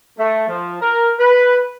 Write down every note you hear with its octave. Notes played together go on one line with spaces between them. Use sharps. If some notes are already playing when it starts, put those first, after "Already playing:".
A3
F3
A#4
B4